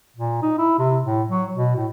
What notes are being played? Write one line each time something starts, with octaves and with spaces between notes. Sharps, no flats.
A#2
D#4
E4
C3
A2
F#3
B2
A2